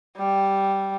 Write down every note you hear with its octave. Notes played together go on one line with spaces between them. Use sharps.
G3